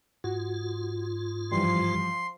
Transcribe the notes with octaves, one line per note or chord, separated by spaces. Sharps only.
G#2 F4 F#4
G2 E3 F3 G3 C6